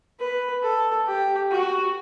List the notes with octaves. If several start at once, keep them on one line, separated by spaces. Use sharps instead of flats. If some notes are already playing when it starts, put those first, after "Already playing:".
B4
A4
G4
F#4